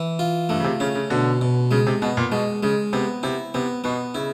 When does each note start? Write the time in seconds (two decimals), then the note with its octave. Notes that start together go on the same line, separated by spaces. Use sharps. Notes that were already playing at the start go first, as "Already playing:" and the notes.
Already playing: E3
0.19 F4
0.49 G2 A3
0.60 C#3
0.64 C3
0.80 C#3 C#4
0.95 C#3
1.10 B2 D3
1.41 B2
1.71 C#3 G#3
1.87 C3
2.02 B2 B3
2.17 A#2
2.32 B2 G#3
2.63 C#3 G#3
2.93 C3 B3
3.23 C3 E4
3.54 C3 B3
3.84 B2 B3
4.15 C#3 E4